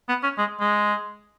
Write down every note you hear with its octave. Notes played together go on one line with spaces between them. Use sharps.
B3
C#4
G#3
G#3